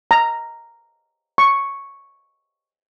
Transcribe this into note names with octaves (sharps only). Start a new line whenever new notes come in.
A#5
C#6